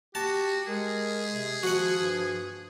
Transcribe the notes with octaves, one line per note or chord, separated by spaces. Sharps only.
F#4 G4 A5
G#3 G#4 A#4
C3
D#3 F3 F#4 F#5
G2